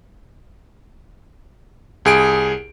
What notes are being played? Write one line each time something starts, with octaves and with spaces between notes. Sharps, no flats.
C2 G#4 D7